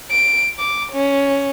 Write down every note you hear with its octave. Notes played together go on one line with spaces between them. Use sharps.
D7
D6
C#4